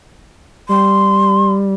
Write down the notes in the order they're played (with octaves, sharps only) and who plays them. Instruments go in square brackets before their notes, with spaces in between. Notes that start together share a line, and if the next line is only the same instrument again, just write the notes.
[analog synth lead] G3 [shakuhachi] C6